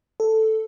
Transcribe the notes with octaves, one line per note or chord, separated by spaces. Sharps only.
A4